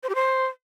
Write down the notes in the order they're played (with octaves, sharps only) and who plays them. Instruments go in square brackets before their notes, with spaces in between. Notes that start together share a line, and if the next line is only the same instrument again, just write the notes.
[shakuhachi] C5
G4
C5